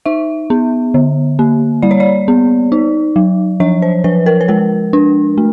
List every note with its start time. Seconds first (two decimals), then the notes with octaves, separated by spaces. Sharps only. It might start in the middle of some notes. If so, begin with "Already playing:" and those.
0.06 D#4 E5
0.50 B3
0.94 D3
1.39 A#3
1.82 G3 D5
1.91 C#5
2.00 D5
2.28 B3
2.72 D#4
3.16 F#3
3.60 F3 C#5
3.82 C5
4.04 F3 B4
4.26 A#4
4.41 B4
4.48 G#3 A#4
4.93 D4
5.38 A3